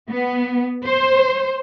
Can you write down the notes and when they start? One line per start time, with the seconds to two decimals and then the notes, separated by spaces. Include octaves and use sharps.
0.11 B3
0.85 C5